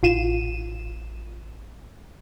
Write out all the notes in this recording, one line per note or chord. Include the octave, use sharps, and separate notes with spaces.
A1 F4 D#7 E7